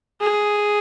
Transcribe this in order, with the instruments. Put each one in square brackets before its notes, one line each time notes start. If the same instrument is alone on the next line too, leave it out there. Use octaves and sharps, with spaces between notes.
[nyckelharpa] G#4